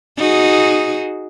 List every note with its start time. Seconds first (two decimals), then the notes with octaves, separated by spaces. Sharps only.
0.17 D#4 F#4 G#4